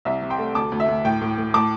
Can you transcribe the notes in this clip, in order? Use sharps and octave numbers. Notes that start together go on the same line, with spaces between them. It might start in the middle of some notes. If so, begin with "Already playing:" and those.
C2 E5
C3
G5 C6
A3
D2 A5 D6
D2
E5
D2
A2 G5
A2
A2
A2 A5 D6